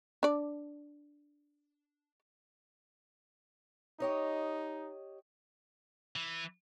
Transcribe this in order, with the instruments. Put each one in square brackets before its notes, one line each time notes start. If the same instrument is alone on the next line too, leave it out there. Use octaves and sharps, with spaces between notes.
[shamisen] D4 D5
[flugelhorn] D#4 [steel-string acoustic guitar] G4 C#5 D#5
[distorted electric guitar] E3